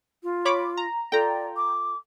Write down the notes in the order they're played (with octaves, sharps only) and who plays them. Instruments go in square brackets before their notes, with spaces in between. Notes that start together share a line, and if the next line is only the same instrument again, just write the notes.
[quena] F4
[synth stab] C#5 B5 D6
A#5
[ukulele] F4 A4 [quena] D5 [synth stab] G5 A#5
[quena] D6